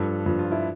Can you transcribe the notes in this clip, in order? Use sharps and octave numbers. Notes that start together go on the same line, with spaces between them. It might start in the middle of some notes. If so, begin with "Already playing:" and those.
Already playing: G2 F3 A4
G2 F3
F4
E4